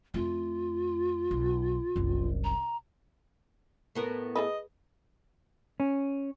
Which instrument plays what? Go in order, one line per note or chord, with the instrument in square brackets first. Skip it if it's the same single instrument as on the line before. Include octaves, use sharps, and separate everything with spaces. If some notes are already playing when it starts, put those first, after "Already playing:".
[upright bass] F2 A3 [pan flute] F4
[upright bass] B1
F#1 C2
[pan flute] A#5
[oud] A2 B3 A#4
[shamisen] G#4 A4 B4 [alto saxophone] D#5
[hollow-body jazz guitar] C#4